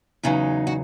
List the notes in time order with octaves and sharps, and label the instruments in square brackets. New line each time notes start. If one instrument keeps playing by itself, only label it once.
[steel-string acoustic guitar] E2 C#3 F#3 D#4
F#4